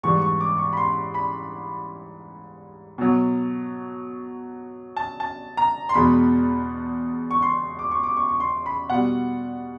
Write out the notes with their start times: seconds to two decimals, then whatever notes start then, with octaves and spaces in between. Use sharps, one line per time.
0.03 G#2 E3 G3 C#6
0.22 C#6
0.41 D6
0.58 C#6
0.73 B5
0.77 C6
1.14 B5
2.98 B2 F#3
4.97 A5
5.20 A5
5.57 A#5
5.89 C6
5.94 E2 B2 G#3 B5
7.31 C#6
7.42 C6
7.79 D6
7.91 C#6
8.03 D6
8.17 C#6
8.29 C#6
8.40 C6
8.66 B5
8.90 B2 G3 F#5